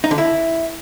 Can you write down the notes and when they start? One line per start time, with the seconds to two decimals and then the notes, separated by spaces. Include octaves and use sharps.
0.04 D#4
0.11 D3
0.18 E4